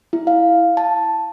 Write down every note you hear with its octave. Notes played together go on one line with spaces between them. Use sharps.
E4
F5
A5